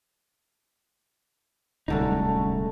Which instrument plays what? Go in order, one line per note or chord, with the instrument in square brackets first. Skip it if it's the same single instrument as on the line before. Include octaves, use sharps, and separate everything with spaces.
[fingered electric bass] D1 C2 [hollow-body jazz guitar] F#2 D3 D#4 [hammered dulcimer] G#3 A3